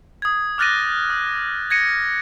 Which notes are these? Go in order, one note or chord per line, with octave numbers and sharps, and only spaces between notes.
D#6 G#6
D6 F6 F#6 A6 A#6 D#7
D#6
G#6 A#6 C#7 D#7